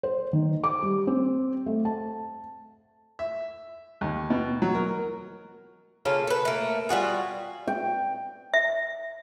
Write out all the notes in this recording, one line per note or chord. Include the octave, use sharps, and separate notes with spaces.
C5
D#3
D6
G3
C4
A3
A5
E5
D#2
B2
F#3
A#4
C#3 A#3 F4 A4
A4 B4
A3 A#3
G3 F4 F#4 G#4
G5
E5